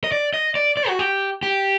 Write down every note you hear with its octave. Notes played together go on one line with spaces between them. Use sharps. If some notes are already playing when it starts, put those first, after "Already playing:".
D#5
D5
D#5
D5
D5
F#4
G4
G4